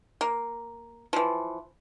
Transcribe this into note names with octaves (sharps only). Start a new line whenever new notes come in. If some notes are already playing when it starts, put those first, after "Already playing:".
A#3
E3 F3